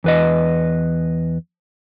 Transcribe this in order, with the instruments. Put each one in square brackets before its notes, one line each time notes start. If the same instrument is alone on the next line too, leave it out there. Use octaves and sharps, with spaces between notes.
[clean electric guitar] E2 B4 D#5